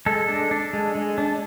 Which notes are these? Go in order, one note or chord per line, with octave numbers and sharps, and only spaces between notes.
G#3 A4
D4
D4
G#3
G#3
D4